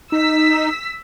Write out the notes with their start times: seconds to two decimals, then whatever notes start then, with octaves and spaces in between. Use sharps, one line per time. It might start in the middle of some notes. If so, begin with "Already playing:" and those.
0.12 D#4 E6 B6